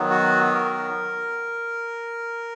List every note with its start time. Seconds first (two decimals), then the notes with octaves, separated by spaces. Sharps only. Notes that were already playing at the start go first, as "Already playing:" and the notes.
Already playing: D#3 F#3 B3
0.10 F#4
0.54 A#4